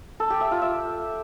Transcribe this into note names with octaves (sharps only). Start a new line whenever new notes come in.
A4
G4
E5
F4
E5